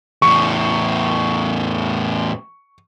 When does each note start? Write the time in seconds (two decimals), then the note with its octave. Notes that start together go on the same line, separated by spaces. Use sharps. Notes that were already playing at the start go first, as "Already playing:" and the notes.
0.22 E2 A2 C#6